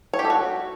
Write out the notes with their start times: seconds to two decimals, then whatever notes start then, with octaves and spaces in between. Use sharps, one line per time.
0.13 C#5
0.19 G4
0.24 A4
0.30 F#4